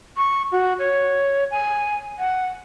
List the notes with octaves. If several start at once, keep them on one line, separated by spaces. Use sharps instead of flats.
C#6
F#4
C#5
G#5
F#5